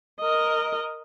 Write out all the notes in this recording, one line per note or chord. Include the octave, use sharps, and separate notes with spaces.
A#4 D#5